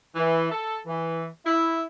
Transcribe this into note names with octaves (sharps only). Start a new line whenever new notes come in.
E3
A4
E3
E4